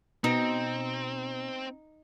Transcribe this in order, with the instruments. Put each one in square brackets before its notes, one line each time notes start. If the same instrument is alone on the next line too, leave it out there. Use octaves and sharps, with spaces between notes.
[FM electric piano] B2 [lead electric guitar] C4 [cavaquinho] D#4